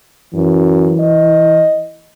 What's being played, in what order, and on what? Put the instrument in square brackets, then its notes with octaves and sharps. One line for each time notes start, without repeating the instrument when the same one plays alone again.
[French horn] F#2 [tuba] E3
[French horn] D#5